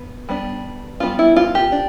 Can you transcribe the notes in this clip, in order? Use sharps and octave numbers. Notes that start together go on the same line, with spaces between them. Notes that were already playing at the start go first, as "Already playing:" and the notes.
Already playing: B3
G3 B3 D4
G3 B3 D4 F4
E4
F4
G4
D4